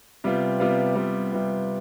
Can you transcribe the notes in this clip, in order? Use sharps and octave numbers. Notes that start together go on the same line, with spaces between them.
C3 G3 B3 F4
C3 G3 B3 F4
C3 G3 B3 F4
C3 G3 B3 F4